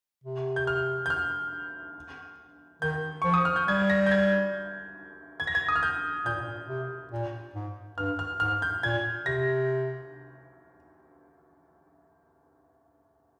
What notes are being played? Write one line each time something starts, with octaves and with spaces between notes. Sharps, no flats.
C3
G6
F6
G6
F6
D#3 G6
F3 C#6
D#6
F6
G6
G3 G#6
A#6
G6
G#6
G#6
A#6
G#6
D#6
F6
G6
A#2 G6
G#2
A#2
C3
A#2
G#2
G2 F6
F6
G#2 F6
G6
A#2 G#6
C3 A#6